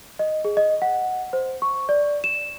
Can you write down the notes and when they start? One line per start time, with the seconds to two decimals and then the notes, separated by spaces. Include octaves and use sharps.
0.19 D#5
0.45 G#4
0.57 D#5
0.82 F#5
1.33 C5
1.62 C#6
1.89 D5
2.24 E7